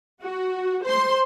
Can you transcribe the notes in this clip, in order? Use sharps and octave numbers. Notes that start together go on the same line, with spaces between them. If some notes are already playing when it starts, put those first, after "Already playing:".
F#4
C5 C6